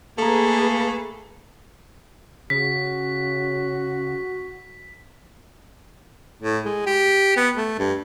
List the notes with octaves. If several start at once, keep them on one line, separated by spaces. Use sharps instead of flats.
A3 A#3 G#4 A4 B4 A#5
C#3 F#4 B6
A2
G#3
G4
B3
A3
G2